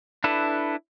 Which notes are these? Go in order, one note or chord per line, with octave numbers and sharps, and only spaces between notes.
D4 E4 A4 B4